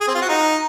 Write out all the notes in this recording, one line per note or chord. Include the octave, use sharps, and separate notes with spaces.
G#4
C4
F4
F#4
D#4